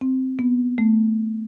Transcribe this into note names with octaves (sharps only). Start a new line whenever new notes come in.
C4
B3
A3